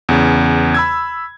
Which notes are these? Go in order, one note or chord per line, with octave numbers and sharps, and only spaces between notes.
E2 C#3
B5 E6 G#6